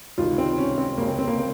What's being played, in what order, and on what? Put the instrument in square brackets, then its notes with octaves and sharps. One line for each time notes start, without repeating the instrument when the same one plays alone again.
[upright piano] C#2 C3 D#3 F4
C4
C#4
C4
C#2 C#3 A#3
C4
C4
A#3
C4